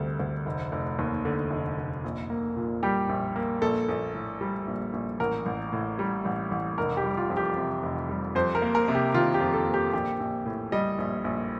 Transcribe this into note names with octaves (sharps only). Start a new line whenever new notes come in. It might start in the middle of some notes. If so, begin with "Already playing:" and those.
Already playing: D2 C3 G3 A4
D2
F1
F1
D#2
D3
F1
F1
A#1
A#3
A#2
G3 G4
A#1
A#3
A#1 A4
A#1
A2
G3
A#1
A#1
A1 A#4
A1
A2
G3
A1
A1
F1 A#4
G4
G3
F4
F2
G4
C3
F1
G3
F2 C5
A#4
A#3
A#4
C3
G4
D#3 F4
G4
F2
A4
A#3
G4
A#1 G4
A#1
A2
G3 D#5
A#1
A#1